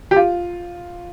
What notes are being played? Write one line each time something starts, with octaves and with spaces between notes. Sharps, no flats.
G4
F4